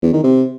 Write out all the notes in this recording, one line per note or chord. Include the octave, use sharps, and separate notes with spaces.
E2
D#3
C3